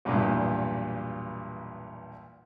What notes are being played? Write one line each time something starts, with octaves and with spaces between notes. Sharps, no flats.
B1 E2 G2 A#2